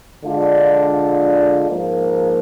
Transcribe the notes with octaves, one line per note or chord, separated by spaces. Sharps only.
D3 G#3 D4 F4
G#2 F3 A#3